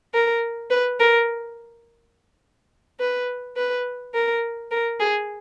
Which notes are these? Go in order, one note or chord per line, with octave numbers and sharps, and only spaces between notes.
A#4
B4
A#4
B4
B4
A#4
A#4
G#4